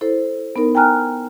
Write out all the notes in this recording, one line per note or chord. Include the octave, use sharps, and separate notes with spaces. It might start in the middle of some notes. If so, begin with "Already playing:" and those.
E4 A4 C5
B3 D#4 A#4
G5 G#5 A#5 F6 F#6